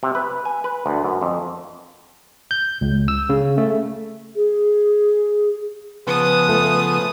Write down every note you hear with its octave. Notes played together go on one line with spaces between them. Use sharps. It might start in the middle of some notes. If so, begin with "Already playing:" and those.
C3
B4
G#5
B4
D2
F#2
F2
G6
C#2
E6
C#3
A3
G#4
C#3 F3 B3 B4 A5 D#6
A3 F4 A4